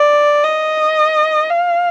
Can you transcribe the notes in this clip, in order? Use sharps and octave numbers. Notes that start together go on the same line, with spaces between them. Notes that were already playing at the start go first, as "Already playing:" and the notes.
Already playing: D5
D#5
F5